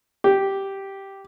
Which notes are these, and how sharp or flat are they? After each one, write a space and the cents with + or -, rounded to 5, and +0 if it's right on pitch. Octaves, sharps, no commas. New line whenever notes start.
G4 -5